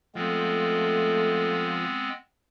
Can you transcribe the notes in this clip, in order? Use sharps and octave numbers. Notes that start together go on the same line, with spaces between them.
F3 G#3 A3 B3 C4